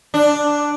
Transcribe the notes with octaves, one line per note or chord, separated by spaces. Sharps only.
D4